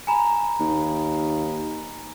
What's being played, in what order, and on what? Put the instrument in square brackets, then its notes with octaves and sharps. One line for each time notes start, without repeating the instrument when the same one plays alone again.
[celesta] G#5 A#5 B5
[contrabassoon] D#2